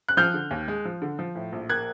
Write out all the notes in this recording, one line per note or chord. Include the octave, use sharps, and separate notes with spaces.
F#6
F3 F6 G6
D3
D#2
G#3
F3
D3
F3
A2
A#1
A#3 F#6 G#6